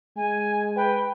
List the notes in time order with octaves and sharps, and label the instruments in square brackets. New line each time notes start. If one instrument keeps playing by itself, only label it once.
[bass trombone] G#3 [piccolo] G#5
[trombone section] B4 [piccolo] G5